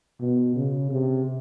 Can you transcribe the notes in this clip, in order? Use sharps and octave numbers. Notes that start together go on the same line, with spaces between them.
B2
C#3
C3